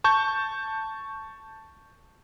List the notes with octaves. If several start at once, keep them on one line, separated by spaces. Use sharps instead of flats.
A5 C#6 G6